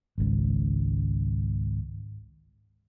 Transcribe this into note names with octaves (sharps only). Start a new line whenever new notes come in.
G#1 C#2